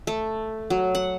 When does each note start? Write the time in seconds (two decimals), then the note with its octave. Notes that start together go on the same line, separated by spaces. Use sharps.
0.07 A3
0.70 F#3
0.95 F#5